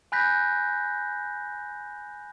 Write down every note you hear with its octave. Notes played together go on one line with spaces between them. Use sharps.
G#5 B5 F#6 G6 A#6 B6